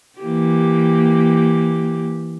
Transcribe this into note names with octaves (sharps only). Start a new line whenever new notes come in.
E3 A#3 G4